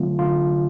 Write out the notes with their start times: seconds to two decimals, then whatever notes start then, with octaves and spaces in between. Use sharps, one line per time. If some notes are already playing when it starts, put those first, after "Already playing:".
Already playing: D3 F#3 A3 C4 F4
0.19 D3 F4